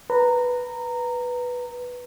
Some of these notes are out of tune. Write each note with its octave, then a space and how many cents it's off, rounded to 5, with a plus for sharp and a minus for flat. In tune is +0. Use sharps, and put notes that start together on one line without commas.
B4 -5 A#5 -15